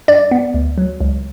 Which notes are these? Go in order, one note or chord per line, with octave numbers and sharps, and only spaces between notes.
G2 D5
B3
D2
F#3
C#2